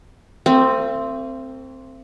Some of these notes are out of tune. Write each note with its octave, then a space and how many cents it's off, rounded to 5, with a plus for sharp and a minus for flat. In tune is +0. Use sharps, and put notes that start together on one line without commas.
A3 +45 C4 +0